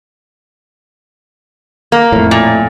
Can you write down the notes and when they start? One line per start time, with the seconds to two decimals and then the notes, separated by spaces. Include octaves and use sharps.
1.92 A#3
2.12 F2 A2
2.31 A#2